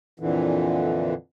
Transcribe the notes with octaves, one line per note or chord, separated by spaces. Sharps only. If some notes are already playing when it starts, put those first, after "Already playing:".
F2 A#2 D3 E3